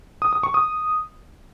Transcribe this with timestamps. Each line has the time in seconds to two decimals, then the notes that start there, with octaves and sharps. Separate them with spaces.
0.22 D#6
0.33 D#6
0.43 C#6
0.54 D#6